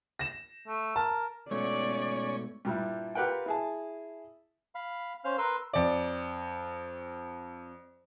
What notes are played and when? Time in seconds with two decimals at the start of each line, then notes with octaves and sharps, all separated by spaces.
0.19 A#6 E7
0.67 A3
0.96 A#4 A5
1.51 G#2 B2 A3 C#4 C#5 D5
2.65 G2 A#2 G3 E4
3.15 F4 G4 A#4 B4 F#5 G5
3.46 E4 G#4 A5
4.75 F5 B5
5.24 C#4 C5 F5 F6
5.38 A#4 B4 C6 E6
5.73 F2 D5